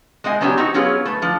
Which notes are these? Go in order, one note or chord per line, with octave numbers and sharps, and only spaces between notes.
G#3 C4 D#5 F5 G#5
F#3 B3 C#4 D4 G4
C4 D#4 F#4 G4
F#3 B3 C#4 F4 G#4 B4
A3 B4
D3 F3